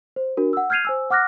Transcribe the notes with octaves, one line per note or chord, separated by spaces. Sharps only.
C5
D4 F#4 A#4
F#5 E6
F6 G6 G#6 C7 D#7 F7
C5 G#5 E6
F#5 D6 F6 F#6 A#6